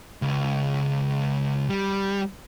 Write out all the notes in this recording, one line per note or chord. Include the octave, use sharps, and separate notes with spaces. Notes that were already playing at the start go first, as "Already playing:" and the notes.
C#2
G3